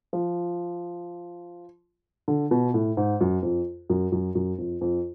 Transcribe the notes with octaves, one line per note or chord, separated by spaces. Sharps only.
F3
D3
B2
A2
G#2
F#2
F2
F#2
F#2
F#2
F2
F2